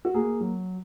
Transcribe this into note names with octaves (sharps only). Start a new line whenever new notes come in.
F#4
A#3 G#4
F#3